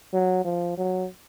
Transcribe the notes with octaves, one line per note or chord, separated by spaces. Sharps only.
F#3
F3
F#3